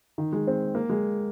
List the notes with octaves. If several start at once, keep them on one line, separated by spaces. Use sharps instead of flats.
D#3
G#3
C4
A#3
G#3